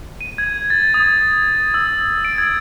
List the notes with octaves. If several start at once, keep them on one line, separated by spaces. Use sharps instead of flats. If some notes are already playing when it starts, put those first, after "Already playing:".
D#7
G#6
A6
D#6
E6
D7
G#6